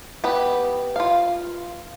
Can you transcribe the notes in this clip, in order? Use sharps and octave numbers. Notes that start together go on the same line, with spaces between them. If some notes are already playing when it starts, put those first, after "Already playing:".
B3 G4 B4
F4 F5